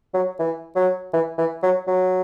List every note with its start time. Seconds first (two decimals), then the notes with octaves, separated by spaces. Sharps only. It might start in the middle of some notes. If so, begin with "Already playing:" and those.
0.14 F#3
0.39 E3
0.76 F#3
1.13 E3
1.38 E3
1.63 F#3
1.87 F#3